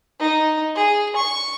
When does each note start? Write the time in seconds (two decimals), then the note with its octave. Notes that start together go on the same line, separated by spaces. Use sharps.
0.19 D#4
0.75 G#4
1.16 C#6